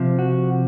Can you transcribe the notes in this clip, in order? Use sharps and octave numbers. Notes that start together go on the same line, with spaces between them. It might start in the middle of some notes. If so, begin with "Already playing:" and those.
Already playing: C3 F3
F#4